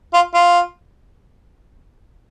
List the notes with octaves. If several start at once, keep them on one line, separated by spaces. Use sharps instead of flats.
F4
F4